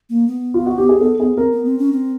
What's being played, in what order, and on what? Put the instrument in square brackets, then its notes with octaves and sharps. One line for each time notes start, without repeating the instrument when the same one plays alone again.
[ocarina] A#3
B3
[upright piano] F4
F#4
G4
G#4
A4
G#4
[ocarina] C4 [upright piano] A#4
[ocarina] B3
C4
C#4
C4